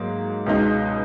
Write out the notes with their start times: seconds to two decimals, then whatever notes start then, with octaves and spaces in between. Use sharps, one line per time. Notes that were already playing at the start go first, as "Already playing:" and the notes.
Already playing: G#2 F#3 A#3
0.46 C#2 B2 G#3 D#4